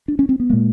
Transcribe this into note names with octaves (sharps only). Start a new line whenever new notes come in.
D4
C#4
C4
B3
A#2 G#3 A#3